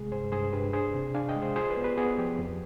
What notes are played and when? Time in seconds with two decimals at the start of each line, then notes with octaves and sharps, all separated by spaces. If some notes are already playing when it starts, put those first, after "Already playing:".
Already playing: C3 G#3 G#4
0.12 G2 G#4 C5
0.32 G2 G#4 C5
0.53 D4 G4 B4
0.73 D4 G#4 C5
0.94 C3
1.15 D4 F5 G#5
1.29 D#5 G5
1.36 G#3
1.42 G#4 C5
1.56 F4 G#4 C5
1.70 B4 D5
1.77 B3
1.84 G4 B4
1.97 B3 G#4
2.18 F3 G4
2.39 F2